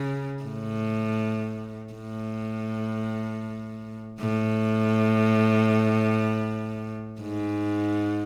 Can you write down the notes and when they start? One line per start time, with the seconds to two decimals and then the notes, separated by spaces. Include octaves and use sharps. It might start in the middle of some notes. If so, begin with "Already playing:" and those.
Already playing: C#3
0.43 A2
1.93 A2
4.20 A2
7.21 G#2